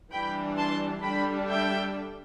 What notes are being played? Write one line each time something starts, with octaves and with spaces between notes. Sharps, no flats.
E3 G3 D4 G5 B5
A5 C6
D3 G3 D4 G5 B5
E5 G5